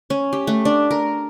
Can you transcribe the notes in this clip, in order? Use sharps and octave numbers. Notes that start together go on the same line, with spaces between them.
C#4
G4
A3
D4
A#4